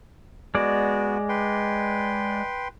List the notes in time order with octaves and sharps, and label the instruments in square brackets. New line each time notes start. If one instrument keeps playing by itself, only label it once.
[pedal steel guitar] G#3 D5 [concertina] B3 F#4
[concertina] B4 G5 C6